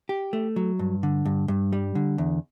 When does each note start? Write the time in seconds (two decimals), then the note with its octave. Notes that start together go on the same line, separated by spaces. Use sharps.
0.09 G4
0.33 A3
0.56 F#3
0.79 G2
1.03 D3
1.25 G2
1.48 G2
1.72 G3
1.95 D3
2.18 E2